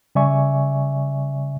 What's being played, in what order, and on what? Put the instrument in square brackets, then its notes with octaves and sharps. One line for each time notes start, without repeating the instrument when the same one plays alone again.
[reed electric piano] C#3 G3 D5 E5 G#5 C#6